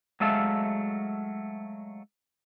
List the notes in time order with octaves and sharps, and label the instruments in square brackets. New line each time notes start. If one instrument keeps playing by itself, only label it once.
[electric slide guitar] F#3 G#3 A3 E5 F5 A5